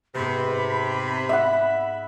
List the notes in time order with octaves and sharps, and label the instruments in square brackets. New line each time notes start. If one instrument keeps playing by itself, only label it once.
[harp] G#2 B3 [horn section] C3 [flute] B5
[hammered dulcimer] E5 F#5